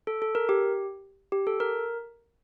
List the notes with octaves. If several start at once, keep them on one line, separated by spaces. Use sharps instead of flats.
A4
A4
A#4
G4
G4
A4
A#4